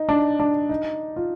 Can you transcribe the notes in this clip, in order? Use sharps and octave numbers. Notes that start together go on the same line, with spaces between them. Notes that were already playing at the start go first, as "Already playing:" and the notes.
Already playing: D#4
D4
D4
D#4
F4